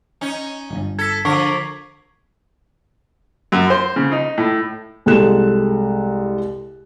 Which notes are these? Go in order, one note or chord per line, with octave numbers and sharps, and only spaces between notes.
C#4 D#4
D1 G1
A4 G#6 B6
D3 F3 A#4 C#6 D6 C7
F#2
C5
C#3
D#4
A2
C2 G#3 A4 F#6 E7